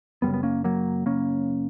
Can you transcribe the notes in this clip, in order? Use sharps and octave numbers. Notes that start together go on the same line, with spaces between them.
F#2 C#3 G3 B3
B3
A#3 C#4
F#3 A#3
F#2 C#3 A#3 C#4